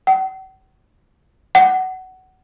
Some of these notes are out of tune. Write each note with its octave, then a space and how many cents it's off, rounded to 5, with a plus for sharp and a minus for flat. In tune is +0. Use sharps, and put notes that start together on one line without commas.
F#5 +45
F#5 +20